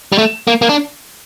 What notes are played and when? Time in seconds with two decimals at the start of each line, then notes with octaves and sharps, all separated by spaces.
0.12 G3
0.18 A3
0.47 A#3
0.62 A#3
0.69 D4